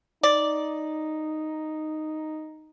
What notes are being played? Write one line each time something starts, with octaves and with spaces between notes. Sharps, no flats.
D#4 D5